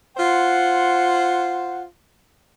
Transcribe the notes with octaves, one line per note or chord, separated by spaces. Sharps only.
F4 C5 F#5